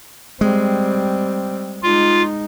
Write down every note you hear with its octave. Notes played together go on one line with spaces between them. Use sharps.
G3 G#3 C4
G#3 D#4 F4